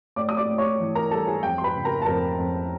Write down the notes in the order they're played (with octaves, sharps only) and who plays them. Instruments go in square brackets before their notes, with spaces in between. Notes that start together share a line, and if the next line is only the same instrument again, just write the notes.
[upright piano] A2 D5 D6
D#6
D5 D6
A2
C#5 C#6
E3
A#4 A#5
G3 A4 A5
G#4 G#5
F2 G5
C6
B4 B5
C#3
A#4 A#5
A5
F2 A#4 A#5
F2